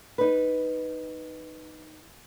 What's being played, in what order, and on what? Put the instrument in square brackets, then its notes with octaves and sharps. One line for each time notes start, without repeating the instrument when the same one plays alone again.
[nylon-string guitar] D#4 B4